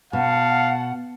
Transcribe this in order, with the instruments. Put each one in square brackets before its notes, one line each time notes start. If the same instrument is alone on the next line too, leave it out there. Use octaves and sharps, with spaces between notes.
[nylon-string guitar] B2 [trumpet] F5 [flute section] F#5 [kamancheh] A5